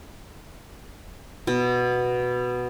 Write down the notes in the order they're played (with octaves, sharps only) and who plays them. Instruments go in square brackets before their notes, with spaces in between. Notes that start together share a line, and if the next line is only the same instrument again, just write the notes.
[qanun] B2